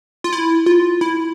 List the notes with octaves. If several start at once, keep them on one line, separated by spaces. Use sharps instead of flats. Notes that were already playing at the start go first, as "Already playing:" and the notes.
F4
E4
F4
E4